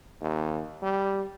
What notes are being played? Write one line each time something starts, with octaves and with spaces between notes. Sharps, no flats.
D#2
G3